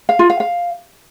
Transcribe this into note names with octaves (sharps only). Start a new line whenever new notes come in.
F5
F4
F5
F5